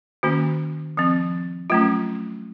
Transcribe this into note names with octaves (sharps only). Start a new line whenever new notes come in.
D#3 A#3 C#4 F#4
F3 C4
F#3 A3 C#4 F4